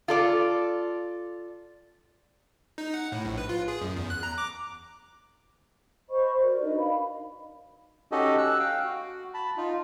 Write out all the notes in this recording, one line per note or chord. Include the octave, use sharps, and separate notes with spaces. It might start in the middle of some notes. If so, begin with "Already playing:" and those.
F4 A4 D5
D#4
F#5
A2
A#1
B4
F4
G#4
F#2
E2
F#6
A#5
D6
C5 D#5 B5 C#6
F#4 A#4 D5
D4 D#4 B4 D#5
F5 B5
C#4 D#4 F#4 G4 A4 D#5
E6 F#6
F5 G5
F#4
A5 B5
D#4 F4